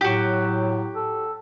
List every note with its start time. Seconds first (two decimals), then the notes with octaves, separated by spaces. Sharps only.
0.01 A2 F#3 F#4 G4
0.95 A4